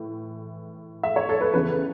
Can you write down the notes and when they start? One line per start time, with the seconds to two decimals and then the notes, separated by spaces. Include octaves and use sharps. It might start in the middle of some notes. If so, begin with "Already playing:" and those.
Already playing: A2 E3
1.03 E5
1.16 C#5
1.29 A4
1.41 B4
1.54 E2 C#3 E3 B4